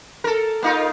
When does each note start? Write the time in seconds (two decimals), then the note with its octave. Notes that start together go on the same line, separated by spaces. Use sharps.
0.24 A4 A#4
0.62 A#3 D#4 F4